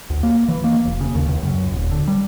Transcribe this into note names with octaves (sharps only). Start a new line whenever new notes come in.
D2
A#3
E3
A#3
E1
C#3
D#2
C#2
F#2
D#1
D3
G3